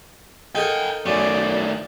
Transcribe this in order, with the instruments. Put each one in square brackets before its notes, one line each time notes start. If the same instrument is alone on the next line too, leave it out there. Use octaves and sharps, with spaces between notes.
[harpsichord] D#4 A4 A#4 [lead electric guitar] F#5 G5
[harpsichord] F#2 [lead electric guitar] D#3 A3 [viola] D5